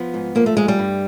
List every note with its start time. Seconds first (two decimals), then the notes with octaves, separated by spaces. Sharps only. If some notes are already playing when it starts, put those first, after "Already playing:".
Already playing: F3 B3
0.14 G#2
0.35 F3 A#3
0.46 A3
0.57 G#2 G#3
0.68 G3
0.79 G2